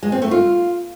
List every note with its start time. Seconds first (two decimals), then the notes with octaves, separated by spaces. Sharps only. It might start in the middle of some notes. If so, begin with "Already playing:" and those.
0.03 G#3
0.12 C4
0.22 A3
0.31 F4